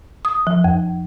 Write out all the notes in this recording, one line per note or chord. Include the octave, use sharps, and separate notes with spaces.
D#6
F3
F2